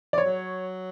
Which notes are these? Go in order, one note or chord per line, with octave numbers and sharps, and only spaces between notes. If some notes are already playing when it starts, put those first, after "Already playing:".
D5
F#3 C#5